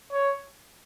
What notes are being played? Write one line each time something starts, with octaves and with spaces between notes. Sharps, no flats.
C#5